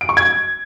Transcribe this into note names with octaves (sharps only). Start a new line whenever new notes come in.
D7
C#6
G#6